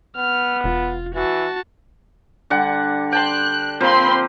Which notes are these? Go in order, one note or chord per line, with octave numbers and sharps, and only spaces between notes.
B3 F6
E1 F4
E3 F#4 A5
D3 G3 F#5
G5 A5 C6 F#6
F3 A#3 C4 C5 B5 C6